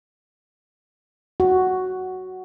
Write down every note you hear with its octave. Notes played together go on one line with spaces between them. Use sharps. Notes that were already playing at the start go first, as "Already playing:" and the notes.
F#4